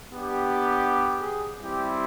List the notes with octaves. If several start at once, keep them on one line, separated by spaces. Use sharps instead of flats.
B3 D4 G4
G#4
G3 C4 E4 G4